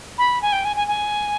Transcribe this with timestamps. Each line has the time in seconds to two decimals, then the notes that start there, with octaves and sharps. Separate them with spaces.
0.18 B5
0.42 G#5
0.52 G5
0.65 G#5
0.76 G#5
0.88 G#5